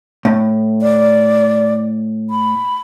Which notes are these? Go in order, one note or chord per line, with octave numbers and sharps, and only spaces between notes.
A2
D5
B5